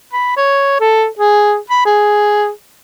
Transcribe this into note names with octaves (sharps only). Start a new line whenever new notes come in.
B5
C#5
A4
G#4
B5
G#4